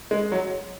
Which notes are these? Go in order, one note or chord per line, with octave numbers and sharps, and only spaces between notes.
G#3
F#3